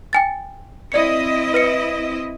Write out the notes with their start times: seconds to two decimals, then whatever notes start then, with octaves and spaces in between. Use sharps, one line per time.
0.13 G5 G#5 A6
0.92 C4 E4 D5 D#5 C#7
1.54 B4 A#6 C#7